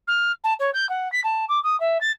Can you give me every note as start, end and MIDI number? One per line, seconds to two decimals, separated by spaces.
0.08 0.32 89
0.44 0.54 81
0.59 0.70 73
0.74 0.89 91
0.89 1.11 78
1.12 1.21 95
1.24 1.45 81
1.49 1.62 86
1.63 1.78 87
1.80 1.98 76
2.01 2.11 93